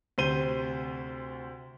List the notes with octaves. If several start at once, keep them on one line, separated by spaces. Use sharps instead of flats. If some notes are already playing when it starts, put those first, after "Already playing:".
D2 C3 C5 D#7 G7